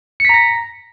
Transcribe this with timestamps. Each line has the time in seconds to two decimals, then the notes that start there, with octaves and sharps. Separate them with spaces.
0.20 C#7
0.25 B6
0.29 A#5
0.34 A#6